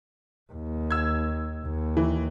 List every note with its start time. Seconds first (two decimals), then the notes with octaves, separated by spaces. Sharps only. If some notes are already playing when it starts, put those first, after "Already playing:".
0.53 D#2
0.91 E6 G#6
1.65 D#2
1.97 E3